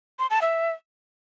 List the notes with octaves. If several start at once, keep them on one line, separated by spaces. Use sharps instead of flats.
C6
A5
E5